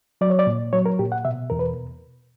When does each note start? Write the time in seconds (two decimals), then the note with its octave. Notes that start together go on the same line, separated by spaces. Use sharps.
0.21 F#3 D5
0.30 C#5
0.39 D5
0.47 A#2
0.73 F#3 C#5
0.86 A#4
0.99 A#2 G4
1.12 F#5
1.25 B2 E5
1.50 E2 A#4
1.59 B4